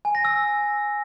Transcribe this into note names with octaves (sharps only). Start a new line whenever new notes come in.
G#5
A#6
E6